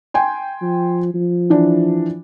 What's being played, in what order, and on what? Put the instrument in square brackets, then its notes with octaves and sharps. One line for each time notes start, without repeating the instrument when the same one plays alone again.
[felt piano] G5 G#5 C6
[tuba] F3
F3
[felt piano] E3 D4